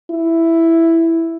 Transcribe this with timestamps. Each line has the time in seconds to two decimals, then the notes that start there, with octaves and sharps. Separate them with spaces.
0.11 E4